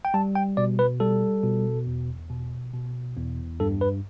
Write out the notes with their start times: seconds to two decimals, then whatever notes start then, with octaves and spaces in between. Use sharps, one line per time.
0.05 G5
0.14 G3 A5
0.35 G5
0.57 B2 D5
0.79 B4
1.00 G3 A4
1.44 B2
1.87 E2
2.30 B2
2.74 B2
3.17 E2
3.60 G2 A4
3.81 B4